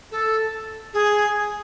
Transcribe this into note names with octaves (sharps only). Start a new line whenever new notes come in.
A4
G#4